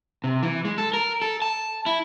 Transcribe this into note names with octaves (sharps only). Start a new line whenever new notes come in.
C3
E3
G#3
A4
A#4
A4
A5
E4